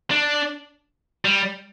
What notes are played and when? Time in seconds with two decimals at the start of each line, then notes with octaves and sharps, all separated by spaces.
0.11 D4
1.25 G3